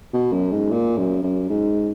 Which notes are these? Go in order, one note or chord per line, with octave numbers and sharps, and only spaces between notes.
B2
F#2
G#2
A#2
F#2
F#2
G#2